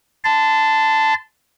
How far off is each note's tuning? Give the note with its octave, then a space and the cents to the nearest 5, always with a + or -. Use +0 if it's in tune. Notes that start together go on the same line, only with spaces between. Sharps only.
A5 +0 C6 -30